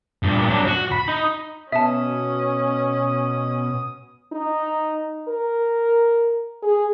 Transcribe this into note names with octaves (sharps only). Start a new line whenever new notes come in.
G2 A#2
F#3 D4
F#4
B5
D#4
B2 C#4 E5 A5 D#6
D#4
A#4
G#4